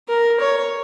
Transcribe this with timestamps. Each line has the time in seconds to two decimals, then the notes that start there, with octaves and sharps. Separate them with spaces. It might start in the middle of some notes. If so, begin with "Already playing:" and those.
0.08 A#4
0.40 C#5